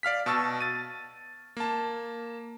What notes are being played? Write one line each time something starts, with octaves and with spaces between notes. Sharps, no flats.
D5 F5 F6 B6
B2 A5 C#6 E6 A6
A6 D#7
A#3 A5